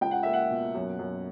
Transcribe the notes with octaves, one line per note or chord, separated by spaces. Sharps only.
C#2 G5
F#5
A#3 E5
F#5
B2
F#2
F#2